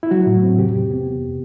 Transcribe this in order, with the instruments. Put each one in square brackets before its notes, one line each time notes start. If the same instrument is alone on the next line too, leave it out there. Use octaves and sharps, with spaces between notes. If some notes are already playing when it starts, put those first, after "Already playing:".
[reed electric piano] E4
F#3 F#4
A2
C4
C3 G4
E2
B3
C3